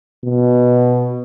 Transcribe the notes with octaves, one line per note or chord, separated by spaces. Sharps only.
B2